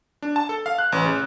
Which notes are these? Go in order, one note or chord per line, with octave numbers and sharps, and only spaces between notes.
D4
A5
A4
F5
F#6
A1
C#3